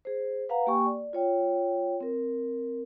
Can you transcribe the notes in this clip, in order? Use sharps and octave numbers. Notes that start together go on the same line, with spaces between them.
G#4 C5
B4 F5 F#5 A#5
A#3 G4 G5 G#5 C#6
D5
F4 C#5 G5
C4 A#4